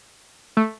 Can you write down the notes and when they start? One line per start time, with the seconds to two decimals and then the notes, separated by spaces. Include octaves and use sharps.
0.57 A3